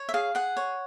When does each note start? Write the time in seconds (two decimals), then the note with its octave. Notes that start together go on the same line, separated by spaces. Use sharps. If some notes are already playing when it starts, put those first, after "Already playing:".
Already playing: C#5
0.09 E5
0.14 G#4 F5
0.35 G#4 F#5
0.57 C#5